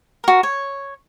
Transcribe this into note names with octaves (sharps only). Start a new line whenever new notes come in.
F#4 A#4
C#5